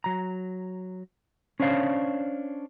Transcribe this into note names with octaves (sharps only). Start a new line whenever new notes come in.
F#3 A#5
C#4 D4 C5 C#5 F5